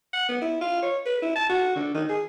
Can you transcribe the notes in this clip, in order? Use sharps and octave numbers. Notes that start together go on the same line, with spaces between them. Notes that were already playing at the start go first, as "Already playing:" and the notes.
F#5
B3
E4
F4
C#5
B4
E4
A5
F#4
D3
D#3
G#4